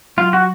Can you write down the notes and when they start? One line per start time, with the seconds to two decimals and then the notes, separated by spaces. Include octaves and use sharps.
0.17 F#3 F4
0.33 F#4